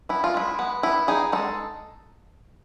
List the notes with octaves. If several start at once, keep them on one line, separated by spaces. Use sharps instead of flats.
B3 E4
F4
G#3 E4
B3
B3 E4
D#4 G#4
G#3 A4